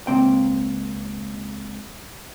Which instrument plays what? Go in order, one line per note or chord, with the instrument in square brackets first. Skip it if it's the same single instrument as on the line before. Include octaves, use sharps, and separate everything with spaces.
[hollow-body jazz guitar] C#2 A#3 C4 G5